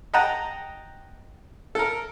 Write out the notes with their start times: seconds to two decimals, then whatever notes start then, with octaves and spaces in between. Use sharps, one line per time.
0.14 D#5 F#5 G5 A5 A#5
1.75 A4 A#4